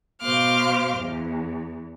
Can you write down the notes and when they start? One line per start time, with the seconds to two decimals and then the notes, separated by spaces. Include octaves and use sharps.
0.21 B2 C5 F5 C6 D6 F6
0.97 E2